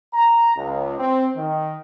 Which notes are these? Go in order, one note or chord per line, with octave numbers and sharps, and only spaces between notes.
A#5
C#2
C4
D#3